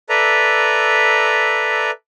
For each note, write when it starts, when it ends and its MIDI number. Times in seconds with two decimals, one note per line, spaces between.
0.09 1.91 69
0.09 1.91 71
0.09 1.91 74
0.09 1.91 76
0.09 1.91 82